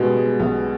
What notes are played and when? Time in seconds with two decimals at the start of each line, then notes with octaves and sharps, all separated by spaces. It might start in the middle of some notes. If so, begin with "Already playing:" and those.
Already playing: B2 G3 G#3 B3
0.17 G#3
0.39 B1 B3